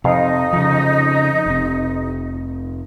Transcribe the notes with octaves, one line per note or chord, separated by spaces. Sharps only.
F2 C3 D#4 F5
C#3 F3
F1 C3